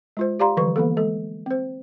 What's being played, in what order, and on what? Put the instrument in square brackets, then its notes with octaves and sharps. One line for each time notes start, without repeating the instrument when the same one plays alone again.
[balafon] G#3 F4 C5
G4 D5 F5 A#5 C6
D3 E3 F3 G3 B4 C#6
E3 A#3 B3 A4
G#3 A4
C4 C5